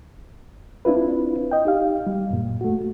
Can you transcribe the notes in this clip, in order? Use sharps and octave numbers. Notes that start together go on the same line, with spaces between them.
C4 D4 E4 F4 B4
D#5 G5
D#4 G4 F5
G3
F#2 A#2
A3 F#4